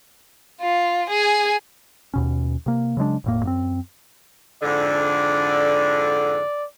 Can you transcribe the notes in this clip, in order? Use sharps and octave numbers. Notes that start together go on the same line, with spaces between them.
F4
G#4 G#5
D#2 B2 C#4
C3 A#3
C#3 F#3 G#3 D4
E1 A2 A#3
F#2 A#3 C4
F2 G#2 D3 D5